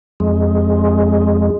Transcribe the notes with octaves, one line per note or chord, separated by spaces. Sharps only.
F2 G#3